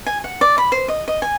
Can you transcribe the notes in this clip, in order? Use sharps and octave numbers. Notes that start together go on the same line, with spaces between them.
G#5
F#5
D5
B5
C5
D#5
D#5
G#5